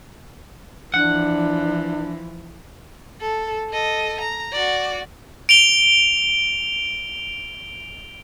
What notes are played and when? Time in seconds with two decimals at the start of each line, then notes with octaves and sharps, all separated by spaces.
0.94 E3 F3 D4 F#5
3.20 A4
3.70 A4 D#5
4.20 A#5
4.52 F#4 D5
5.49 D7 F7 G7